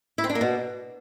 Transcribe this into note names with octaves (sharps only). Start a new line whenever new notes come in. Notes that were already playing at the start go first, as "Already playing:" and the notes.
E4
C4
D4
A#3
B2